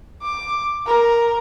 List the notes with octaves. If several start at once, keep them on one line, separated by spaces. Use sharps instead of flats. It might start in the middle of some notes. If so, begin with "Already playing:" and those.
D6
A#4